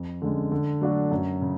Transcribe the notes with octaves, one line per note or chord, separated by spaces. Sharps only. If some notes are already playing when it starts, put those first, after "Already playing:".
Already playing: F2
D3 G#3 C#4
D3
F#3 A3 D4 F#4
F#2
C#3